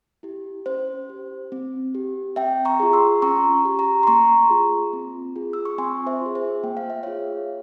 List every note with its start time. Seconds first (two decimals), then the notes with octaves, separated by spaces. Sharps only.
0.23 E4 G4
0.66 C#4 C5
1.09 G4
1.52 C4
1.95 G4
2.36 C4 E5 G5
2.65 A#5 C#6
2.80 F4 G#4
2.93 C6 E6
3.22 C#4 A#5 C#6
3.65 G4
3.79 A#5 C#6
4.03 C6
4.07 A#3 A#5 C#6
4.50 F4 G#4
4.93 C4
5.36 F4 G#4
5.53 E6
5.65 C#6
5.78 C4 G#5 C6
6.06 C5 E5
6.21 F4 G#4
6.35 C5 E5
6.64 A#3 G5
6.77 F5
6.90 E5
7.03 F4 G#4 C#5 F5